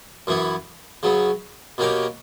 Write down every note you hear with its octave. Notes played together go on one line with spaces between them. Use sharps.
F#2 E3 B3 E4
C#3 F#3 B3
B2 A#3 C#4 G4 A#4